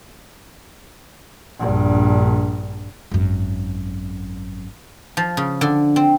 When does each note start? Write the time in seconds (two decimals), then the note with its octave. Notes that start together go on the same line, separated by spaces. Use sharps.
1.60 A#1 G2
3.11 G#1 F#2
5.17 F3
5.37 C#3
5.61 D3
5.96 C4